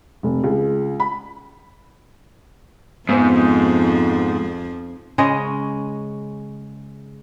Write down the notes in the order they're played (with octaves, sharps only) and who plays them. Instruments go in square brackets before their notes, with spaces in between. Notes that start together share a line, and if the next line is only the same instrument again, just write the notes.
[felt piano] F1
C#2
B5
[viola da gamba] F2 F3 [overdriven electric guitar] G#2 [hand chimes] B3 C5
[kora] C#3 G#3 C#5 D#5